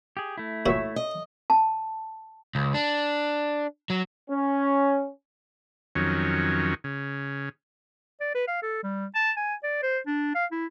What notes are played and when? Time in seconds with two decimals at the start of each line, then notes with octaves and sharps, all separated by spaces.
0.17 G4 G#4
0.37 A3 E4
0.66 A#2 F#4 C#5 E5
0.96 D#5
1.50 A5
2.55 C#2
2.74 D4
3.90 F#3
4.31 C#4
5.95 F2 D#3 F#3 C#4
6.84 C#3
8.21 D5
8.35 B4
8.48 F5
8.63 A4
8.84 G3
9.15 A5
9.37 G#5
9.63 D5
9.83 C5
10.07 D4
10.35 F5
10.52 E4